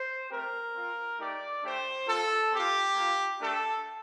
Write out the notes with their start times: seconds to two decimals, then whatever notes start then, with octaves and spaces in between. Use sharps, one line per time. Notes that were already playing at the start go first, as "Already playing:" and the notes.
Already playing: C5
0.30 A3 C4 G4 A#4
0.74 C4 F4
1.18 A3 D#4 G4 D5
1.63 A3 D4 G4 C5
2.07 C4 F4 A4
2.52 C4 F4 G4
2.95 A#3 F4
3.40 A3 D4 G4 A4